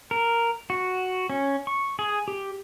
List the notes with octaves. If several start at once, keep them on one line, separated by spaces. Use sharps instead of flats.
A#4
F#4
C#4
C#6
G#4
G4